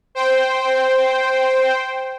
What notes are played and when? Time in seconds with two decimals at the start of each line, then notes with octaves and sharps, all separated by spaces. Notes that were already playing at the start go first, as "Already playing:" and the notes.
0.15 C5 G5